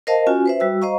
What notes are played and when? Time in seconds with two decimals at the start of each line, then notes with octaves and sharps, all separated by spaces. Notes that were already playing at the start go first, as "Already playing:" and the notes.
0.07 A#4 C5 D#5 F5 A5
0.27 C#4 F4 F#4 G#5
0.46 B4 C5 E5
0.60 G3 F#4 E6
0.82 C5 D#5 F5 A#5 C#6